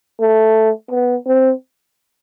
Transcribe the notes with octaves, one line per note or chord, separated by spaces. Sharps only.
A3
B3
C4